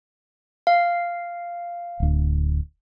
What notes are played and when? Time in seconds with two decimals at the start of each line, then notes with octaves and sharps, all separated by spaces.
0.67 F5
2.00 D1 D2